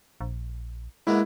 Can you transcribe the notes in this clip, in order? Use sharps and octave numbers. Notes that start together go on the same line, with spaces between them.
A#1
G#2 A#3 B3 E4